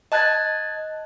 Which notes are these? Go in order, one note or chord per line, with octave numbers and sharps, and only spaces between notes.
D#5 A5 F#6 G#6 A6